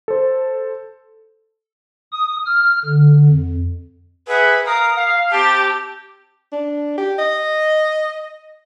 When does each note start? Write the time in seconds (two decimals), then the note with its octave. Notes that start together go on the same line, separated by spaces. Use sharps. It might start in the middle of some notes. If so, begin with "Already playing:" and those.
0.08 A4 C5
2.12 D#6
2.46 F6
2.85 D3
3.28 F2
4.28 G#4 B4 E5 F#5
4.65 A#4 F5 A#5 D#6
4.96 F5
5.31 C4 G4 A5
6.53 D4
6.98 G4
7.19 D#5